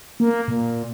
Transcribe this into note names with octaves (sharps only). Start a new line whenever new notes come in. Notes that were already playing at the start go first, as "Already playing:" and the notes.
A#3
A#2